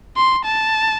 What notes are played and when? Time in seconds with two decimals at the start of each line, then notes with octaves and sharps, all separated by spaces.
0.16 C6
0.45 A5